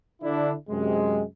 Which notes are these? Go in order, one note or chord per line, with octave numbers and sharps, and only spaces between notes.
D3 D4 E4
F#2 C3 G#3